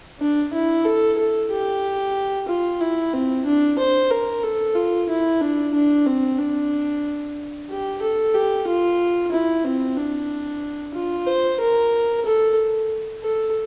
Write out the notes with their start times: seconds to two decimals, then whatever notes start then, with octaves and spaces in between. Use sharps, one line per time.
0.20 D4
0.53 E4
0.85 A4
1.18 A4
1.51 G4
2.48 F4
2.81 E4
3.13 C4
3.46 D4
3.79 C5
4.10 A#4
4.43 A4
4.76 F4
5.09 E4
5.41 D4
5.74 D4
6.06 C4
6.39 D4
7.70 G4
8.02 A4
8.34 G4
8.67 F4
9.32 E4
9.64 C4
9.97 D4
10.94 F4
11.27 C5
11.60 A#4
12.26 A4
13.23 A4